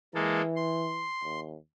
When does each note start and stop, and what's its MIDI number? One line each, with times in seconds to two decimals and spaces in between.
0.14 1.09 52
0.14 0.42 56
0.14 0.42 58
0.14 0.42 69
0.56 1.40 84
1.24 1.57 39